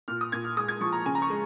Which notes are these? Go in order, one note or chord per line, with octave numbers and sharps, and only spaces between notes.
A#2 F6
D#6
A#2 G#6
F6
G#3 D#6
G#6
F3 C#6
A#5
C#3 G#5
A#5
C#6
G#3